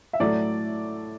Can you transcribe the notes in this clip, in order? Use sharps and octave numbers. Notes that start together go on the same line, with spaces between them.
E5
A2 F#3 A3 D5